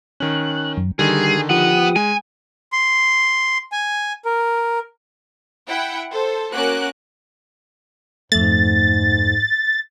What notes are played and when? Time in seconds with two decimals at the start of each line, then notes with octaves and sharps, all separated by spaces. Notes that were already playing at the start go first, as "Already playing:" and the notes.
0.20 D#3 C#4 F#6
0.77 F#2
0.99 D3 D#3 G3 G#4
1.50 F3 B3 G4 F#5 D#6
1.96 G#3 G#5
2.72 C6
3.72 G#5
4.25 A#4
5.68 E4 F#5 G5
6.10 A4 C5
6.52 A#3 C#4 F#4 A#4 D6 F#6
8.32 F2 G#2 A3 A6